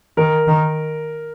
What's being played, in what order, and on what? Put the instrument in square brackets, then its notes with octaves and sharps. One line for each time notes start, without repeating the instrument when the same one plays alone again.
[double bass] D#3 [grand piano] A#4
[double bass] D#3